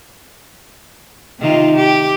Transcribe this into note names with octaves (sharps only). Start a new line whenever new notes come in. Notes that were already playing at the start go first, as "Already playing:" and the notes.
C3 D#3 F4
G4